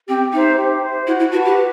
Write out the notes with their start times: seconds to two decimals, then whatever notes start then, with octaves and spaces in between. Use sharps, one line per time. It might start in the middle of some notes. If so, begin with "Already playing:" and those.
0.08 C4 G4
0.32 D#4 C5 E5
0.58 G4
0.82 C5 E5
1.07 E4 F#4
1.19 E4
1.32 F#4 B4 F#5 A5
1.45 G4
1.56 F#4